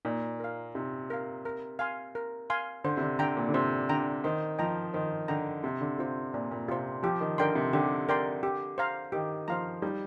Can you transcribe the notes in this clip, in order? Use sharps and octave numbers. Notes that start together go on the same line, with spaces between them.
A#2 D#4
A#4 F5
C3 D#4
A#4 F5
A#4
F5 G#5 C6
A#4
F5 G#5 C6
D3 C5
C3
D3
D3 G5 A#5
A#2
D3
C3 C5
D3 G5 A#5
D#3 C5
F3 D#5 G5 A#5
D#3 C5
D3 D#5 G5 A#5
C3 D4
D3
C3 F4 C5
A#2 D4
A#2
C3 F4 C5
F3 G4
D#3
D3 A#4 D5 G5 C6
C3
D3 G4
A#4 D5 G5 C6
G4
C5 F5 A#5
D#3 G4
F3 C5 F5 A#5
G3 D#4